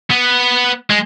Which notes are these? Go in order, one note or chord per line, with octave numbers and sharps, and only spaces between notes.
B3
G#3